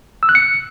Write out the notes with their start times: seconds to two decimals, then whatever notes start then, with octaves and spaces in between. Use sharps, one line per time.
0.23 E6
0.29 F#6
0.35 C#7